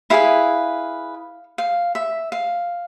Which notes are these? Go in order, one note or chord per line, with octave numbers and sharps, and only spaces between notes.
E4 G#4 B4 F5
F5
E5
F5